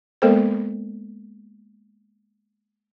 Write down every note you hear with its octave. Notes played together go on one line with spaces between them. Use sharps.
G#3 A#3 B3 A4 A#4 C5